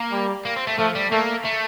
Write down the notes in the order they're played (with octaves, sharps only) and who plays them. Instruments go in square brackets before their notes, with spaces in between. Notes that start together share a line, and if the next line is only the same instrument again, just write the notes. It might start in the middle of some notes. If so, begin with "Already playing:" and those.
Already playing: [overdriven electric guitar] A#3
[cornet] G3
[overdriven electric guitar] A#3
C4
A3
[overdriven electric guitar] F3 [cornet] A3
[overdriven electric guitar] G3
[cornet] A3 [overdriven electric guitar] A#3
[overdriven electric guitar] A3